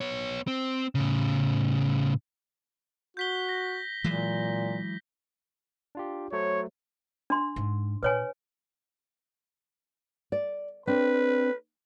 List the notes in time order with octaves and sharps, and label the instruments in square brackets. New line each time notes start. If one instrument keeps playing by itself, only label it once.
[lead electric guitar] B3 C#5
C4
A2 C#3
[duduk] F#4 [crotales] G6 B6 G7
[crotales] A#6
[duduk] A#2 [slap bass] E3 F#3 G#3
[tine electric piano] D4 F4 G4
[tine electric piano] F#3 A3 C5 [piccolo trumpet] C#5
[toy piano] D4 C6
[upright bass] G#2 G#3
[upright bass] A#2 [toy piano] B4 C#5 G#5
[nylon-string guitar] D5
[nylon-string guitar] C4 D4 [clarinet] B4